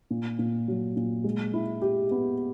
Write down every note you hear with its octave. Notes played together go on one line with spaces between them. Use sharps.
A#2
A#2
F#3
A#2
G#3
E4
G4
B3